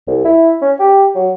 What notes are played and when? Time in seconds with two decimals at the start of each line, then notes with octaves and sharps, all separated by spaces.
0.07 C2
0.25 E4
0.61 C#4
0.79 G4
1.15 F#3